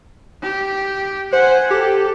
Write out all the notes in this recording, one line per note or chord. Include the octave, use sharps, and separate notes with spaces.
G4
C5 F#5 G#5
G4 A4